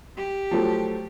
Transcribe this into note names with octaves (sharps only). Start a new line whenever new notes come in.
G4
F3 F#3 A3